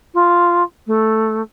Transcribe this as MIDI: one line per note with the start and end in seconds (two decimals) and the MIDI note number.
0.14 0.63 65
0.87 1.42 57